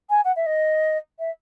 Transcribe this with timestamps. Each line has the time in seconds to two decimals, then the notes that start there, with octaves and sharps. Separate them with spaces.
0.10 G#5
0.24 F#5
0.36 E5
0.46 D#5
1.19 E5